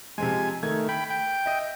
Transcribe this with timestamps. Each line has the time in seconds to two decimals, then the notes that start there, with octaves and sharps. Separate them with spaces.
0.18 C3 F3 G#3 G#5
0.63 D#3 A3 G#6
0.89 G5 B5
1.10 G5
1.46 D#5 E5